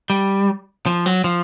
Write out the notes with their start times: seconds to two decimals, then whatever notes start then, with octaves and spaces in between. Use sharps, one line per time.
0.10 G3
0.86 F3
1.06 F#3
1.24 F3